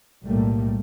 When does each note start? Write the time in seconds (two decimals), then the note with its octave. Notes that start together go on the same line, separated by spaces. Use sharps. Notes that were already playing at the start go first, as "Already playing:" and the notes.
0.24 B1 A2 G3 A3 A#3